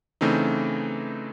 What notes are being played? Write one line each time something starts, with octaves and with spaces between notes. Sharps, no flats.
C#3 E3 A3 C4 D#4